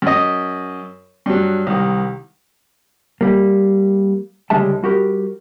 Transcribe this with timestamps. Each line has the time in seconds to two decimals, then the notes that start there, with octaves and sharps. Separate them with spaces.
0.02 F#2 D#5
1.26 G2 F#3
1.67 C2 D#3
3.21 G3 A#3
4.50 C#2 D3 G3 G#3 E5 A5
4.83 G3 F#4 G4 A#4